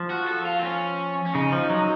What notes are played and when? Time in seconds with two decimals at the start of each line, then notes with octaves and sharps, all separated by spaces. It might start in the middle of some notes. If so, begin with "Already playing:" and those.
Already playing: F3
0.10 F#4
0.27 A4
0.45 F4
0.59 C4
0.64 C#4
1.26 C#4
1.34 C#3 D#4
1.52 F3
1.70 F#3